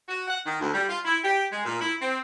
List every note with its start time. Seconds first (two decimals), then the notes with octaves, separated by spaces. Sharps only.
0.09 F#4
0.28 F#5
0.45 D#3
0.60 D2
0.73 G3
0.88 F4
1.05 E4
1.23 G4
1.52 G#3
1.65 A#2
1.80 E4
2.01 C4